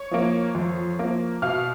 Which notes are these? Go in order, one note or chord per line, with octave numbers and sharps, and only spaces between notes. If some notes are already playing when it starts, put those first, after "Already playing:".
Already playing: C#5 C#6
F3 A#3
F2
F3 A#3
B2 F5 F6